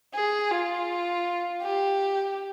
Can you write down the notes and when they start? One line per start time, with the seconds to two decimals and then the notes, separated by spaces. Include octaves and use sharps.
0.15 G#4
0.51 F4
1.62 G4